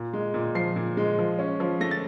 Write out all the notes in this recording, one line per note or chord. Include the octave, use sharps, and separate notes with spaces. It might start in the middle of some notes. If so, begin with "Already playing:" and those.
Already playing: A#2
G#3
A#2
F3 C7
A#2
G#3
F3
C#4
F3
A3 A#6
A6